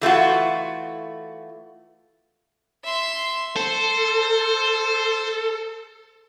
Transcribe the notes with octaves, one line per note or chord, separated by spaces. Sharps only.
E3 A3 F4 F#4
E5 C6
A4 C5